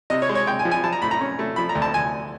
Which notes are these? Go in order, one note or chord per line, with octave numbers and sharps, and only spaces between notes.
C3 D#5
C#5
G#3
C#5
G#3 G5
G#5
F3
G#5
F3 A5
A#5
A2 B5
A#5
C#4
A3
F3 B5
A#5
D2
A5
D2 G#5